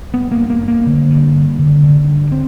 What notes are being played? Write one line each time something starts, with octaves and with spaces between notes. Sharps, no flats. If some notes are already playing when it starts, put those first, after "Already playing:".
G2 B3
A#3
G2
A#3
G2
A#3
D3
G2
G2
D3
D3
G2
C4